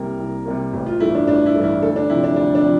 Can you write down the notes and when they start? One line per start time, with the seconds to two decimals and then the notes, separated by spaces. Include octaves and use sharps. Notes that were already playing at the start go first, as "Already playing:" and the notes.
Already playing: C2 C3 G3 A#3 A#4
0.19 C2
0.46 C3 G3 A#3
0.73 A1
0.86 F4
1.00 G2 E3 A3 E4
1.15 D4
1.27 A1 D4
1.46 E4
1.55 G2 E3 A3
1.64 E4
1.82 D2 A4
1.96 D4
2.10 C3 F3 E4
2.24 D4
2.36 D2 D4
2.55 D4
2.64 C3 F3